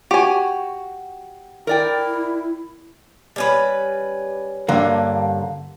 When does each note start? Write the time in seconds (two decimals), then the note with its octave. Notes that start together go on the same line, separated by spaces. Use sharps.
0.11 F#4 G4 G#5
1.67 E4 A#4 D5 G5
3.36 G3 C#4 B4
4.68 G2 D3 A#3